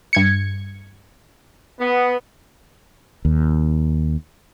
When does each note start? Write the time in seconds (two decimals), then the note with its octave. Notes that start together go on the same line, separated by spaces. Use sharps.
0.13 G2 G#6 C#7
1.80 B3
3.25 D#2